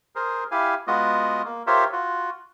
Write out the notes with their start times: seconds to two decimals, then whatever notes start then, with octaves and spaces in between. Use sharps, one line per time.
0.16 G#4 A#4 C5
0.51 E4 G4 F5 G#5
0.87 G#3 B3 F4 F#4 D#5
1.45 A#3
1.67 F4 G4 A#4 C5 C#5 E5
1.93 F4 F#4